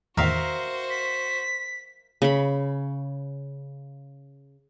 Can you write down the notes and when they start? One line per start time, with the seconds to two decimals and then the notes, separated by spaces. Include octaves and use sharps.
0.17 E2 A2 D#3 F#4 A#4 C5 E5 F5
0.90 B6
2.22 C#3 B5